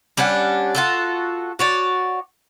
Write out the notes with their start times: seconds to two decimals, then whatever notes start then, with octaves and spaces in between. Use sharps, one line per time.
0.17 G3 C#4 D4 F#5
0.75 F4 F#4 A4
1.59 F#4 C#5 D5